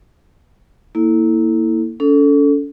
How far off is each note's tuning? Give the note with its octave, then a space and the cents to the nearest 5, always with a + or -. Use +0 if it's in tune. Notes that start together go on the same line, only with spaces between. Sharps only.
A#3 +0 E4 -20 A4 +0
C#4 +40 A4 +0